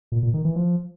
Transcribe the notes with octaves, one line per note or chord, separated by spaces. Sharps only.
A#2
A#2
D#3
E3
F3